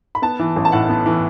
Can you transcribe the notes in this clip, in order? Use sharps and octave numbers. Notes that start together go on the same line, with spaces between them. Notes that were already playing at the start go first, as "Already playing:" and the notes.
B5
B3 A5
E3
A1
A5
A2 F#5
B3
E3